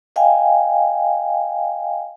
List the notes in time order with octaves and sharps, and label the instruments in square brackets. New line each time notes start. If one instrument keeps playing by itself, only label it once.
[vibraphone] D#5 F5 G5 G#5